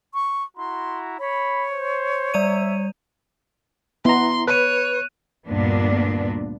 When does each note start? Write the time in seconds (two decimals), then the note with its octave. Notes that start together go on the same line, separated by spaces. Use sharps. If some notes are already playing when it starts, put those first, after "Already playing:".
0.14 C#6
0.57 E4 F#4 A#5 C6
1.19 C#5 B5
1.72 C5
2.34 G3 D5 E5 D#7
4.05 B3 E4 A#5 C6
4.48 B4 C#5 F#6 D#7
5.47 D2 G2 A#2 B3 D4